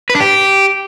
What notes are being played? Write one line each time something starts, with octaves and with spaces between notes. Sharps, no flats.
B4
D4
G4